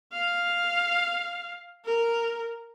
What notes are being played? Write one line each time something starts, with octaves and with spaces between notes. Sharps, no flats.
F5
A#4